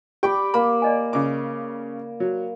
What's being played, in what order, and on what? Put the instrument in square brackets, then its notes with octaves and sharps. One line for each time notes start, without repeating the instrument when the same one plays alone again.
[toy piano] G4 [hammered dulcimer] D5 B5 D6 [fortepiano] G5
[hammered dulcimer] A#3 [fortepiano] B5
[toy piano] D5 D#5 G#5
[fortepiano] C#3 D6
F#3